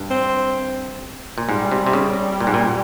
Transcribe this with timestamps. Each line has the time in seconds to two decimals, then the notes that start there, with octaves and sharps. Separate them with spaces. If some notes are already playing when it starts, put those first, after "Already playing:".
Already playing: G2
0.11 C4
1.38 A#2
1.48 G#2 G3
1.72 C3
1.86 C3
1.93 C#3
2.40 A#2
2.47 G#2
2.54 A#2